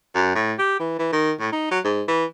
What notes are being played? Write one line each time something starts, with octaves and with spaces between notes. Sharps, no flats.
F#2
A2
G4
E3
E3
D#3
A2
D#4
F#3
G#2
E3